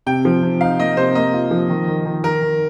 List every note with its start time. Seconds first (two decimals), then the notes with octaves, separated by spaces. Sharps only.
0.06 C3 G5
0.25 F3
0.43 C3
0.61 D#4 F5
0.79 A#3 D#5
0.97 C3 C5
1.15 A#3 D#5
1.33 F4
1.51 F3
1.70 D#3
1.88 D#3
2.06 D#3
2.24 D#3 A#4
2.42 D#3